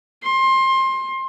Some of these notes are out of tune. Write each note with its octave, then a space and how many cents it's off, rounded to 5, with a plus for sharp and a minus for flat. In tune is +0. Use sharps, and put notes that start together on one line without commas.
C6 +20